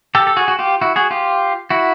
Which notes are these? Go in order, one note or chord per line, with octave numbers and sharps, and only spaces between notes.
G4 A4
A4
F#4 G#4
F#4
F4 G4
E4 F#4
F#4 G#4
F4 G4
E4 F#4